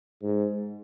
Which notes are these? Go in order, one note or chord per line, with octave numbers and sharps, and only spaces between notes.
G#2